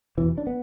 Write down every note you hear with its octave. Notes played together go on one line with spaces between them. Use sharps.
E2 B2 E3
D4
B3